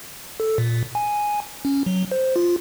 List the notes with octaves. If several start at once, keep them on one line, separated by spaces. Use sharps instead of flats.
A4
A#2
G#5
C#4
F#3
C5
F4